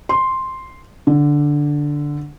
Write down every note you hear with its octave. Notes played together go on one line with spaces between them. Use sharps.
C6
D3